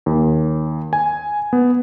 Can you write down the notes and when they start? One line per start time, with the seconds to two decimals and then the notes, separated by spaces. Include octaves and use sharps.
0.06 D#2
0.93 G#5
1.53 B3